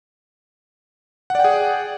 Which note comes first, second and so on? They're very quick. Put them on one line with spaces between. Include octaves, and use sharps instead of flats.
F#5 D5 G5 G#4